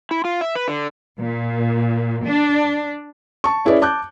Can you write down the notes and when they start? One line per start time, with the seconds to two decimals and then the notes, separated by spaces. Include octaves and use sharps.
0.11 E4
0.25 F4
0.41 E5
0.55 B4
0.68 D3
1.19 A#2
2.24 D4
3.44 A5 C#6
3.65 C#4 E4 G#4 B4 C#5 D5
3.82 A5 D6 F#6 G6